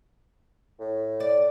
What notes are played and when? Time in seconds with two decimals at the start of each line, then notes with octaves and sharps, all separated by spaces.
0.80 A2
1.20 D5